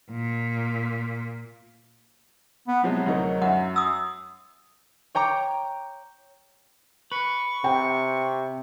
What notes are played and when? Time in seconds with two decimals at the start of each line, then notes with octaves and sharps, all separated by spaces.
0.11 A#2
2.68 B3
2.84 C3 F3 F#3 G#3
3.06 D2 D#4 A#4
3.42 F#2 E5 F#5
3.76 D#6 E6
5.15 C#5 G5 A#5 D6
7.12 B4 C#6
7.64 C3 G5